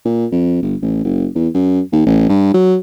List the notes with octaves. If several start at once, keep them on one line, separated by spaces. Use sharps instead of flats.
A#2
F2
G1
A1
F#1
E2
F#2
D#2
A1
G2
F#3